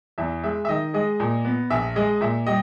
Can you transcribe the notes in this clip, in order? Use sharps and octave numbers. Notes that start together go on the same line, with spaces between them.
E2 E5
G#3 E5
E5
D#3 D#5
G#3 D#5
A#2
B3
A#1 E5
G#3 D#5
A#2 E5
G3 D#5